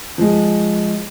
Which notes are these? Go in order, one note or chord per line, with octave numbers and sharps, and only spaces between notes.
F3 G#3